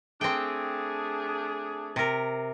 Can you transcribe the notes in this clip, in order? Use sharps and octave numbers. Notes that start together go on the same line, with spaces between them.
A3 C4 D4 G#4 G5
C3 A#4